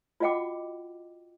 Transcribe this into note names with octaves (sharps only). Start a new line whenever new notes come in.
F4 F#4 D#5 F#5 G5 D6